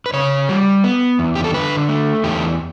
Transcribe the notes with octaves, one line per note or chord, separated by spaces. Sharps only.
B4
C#3 C#5
G3
B3
E2
G4
A4
D3 B4
A3
E2 G4